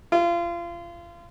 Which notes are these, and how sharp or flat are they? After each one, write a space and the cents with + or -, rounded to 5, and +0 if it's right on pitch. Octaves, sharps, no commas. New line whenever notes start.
F4 -30